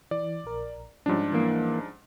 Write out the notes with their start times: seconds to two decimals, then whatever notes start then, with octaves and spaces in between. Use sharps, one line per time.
0.11 E3 D5
0.44 A#1 A#4
1.06 G#2 F3 G3 C#4 D4
1.33 E3 A#3